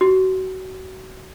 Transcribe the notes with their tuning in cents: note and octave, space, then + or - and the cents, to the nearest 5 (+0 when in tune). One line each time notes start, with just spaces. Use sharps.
F#4 +25